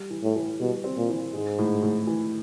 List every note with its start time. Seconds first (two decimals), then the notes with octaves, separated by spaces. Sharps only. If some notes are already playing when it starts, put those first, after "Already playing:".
Already playing: G3
0.10 E3
0.23 A2
0.36 E3
0.60 B2 G3
0.84 C4
0.97 A#2
1.09 E3
1.33 G#2 G#3
1.58 A2
1.83 A2
2.07 E3